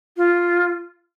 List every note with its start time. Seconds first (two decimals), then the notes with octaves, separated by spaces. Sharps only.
0.17 F4